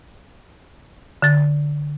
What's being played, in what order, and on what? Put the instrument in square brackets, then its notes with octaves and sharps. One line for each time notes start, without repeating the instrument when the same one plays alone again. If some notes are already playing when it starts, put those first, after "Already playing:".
[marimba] D3 A6